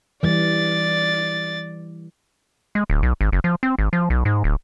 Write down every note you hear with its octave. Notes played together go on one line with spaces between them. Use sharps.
E3 G3 D5 A6
G#3
D1
B1
G#1
F#1
F3
C4
G#1
F3
B1
G#2
D1